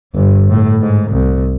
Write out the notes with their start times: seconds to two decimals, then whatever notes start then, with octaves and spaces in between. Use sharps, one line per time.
0.15 G1 G2
0.49 A2
0.81 G#2
1.12 C2